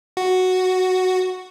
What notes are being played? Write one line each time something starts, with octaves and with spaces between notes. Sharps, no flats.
F#4